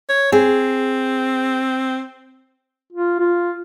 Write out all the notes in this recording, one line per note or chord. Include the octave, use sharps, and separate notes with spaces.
C#5
C4 G#4
F4
F4